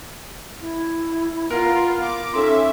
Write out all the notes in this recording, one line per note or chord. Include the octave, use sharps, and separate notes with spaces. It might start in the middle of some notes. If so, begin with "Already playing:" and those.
E4
B3 F4 A#4
D6
C#4 D#4 A4 E5 C6